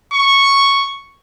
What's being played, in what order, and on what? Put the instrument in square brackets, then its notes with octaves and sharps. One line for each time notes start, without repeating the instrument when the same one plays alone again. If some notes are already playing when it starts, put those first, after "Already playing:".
[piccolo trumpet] C#6